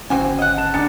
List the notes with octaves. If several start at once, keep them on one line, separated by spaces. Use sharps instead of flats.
G#1 D3 C4 C#4 F#4 G#5
D#5 F#5
A5 E7
D#3 G#3 D4 A6 C#7